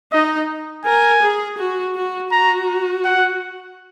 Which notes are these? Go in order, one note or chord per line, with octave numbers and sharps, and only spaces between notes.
D#4 D#5
A#4 G#5
G#4
F#4
F#4
F#4 A#5
F#5